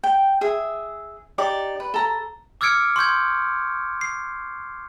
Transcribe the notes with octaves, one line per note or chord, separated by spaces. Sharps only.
G5
G#4 E5
D#4 G4 D5 D6
B4
A4 A#5
D6 E6 F6 G#6 C#7 D7
C6 C#6 G6 G#6
C7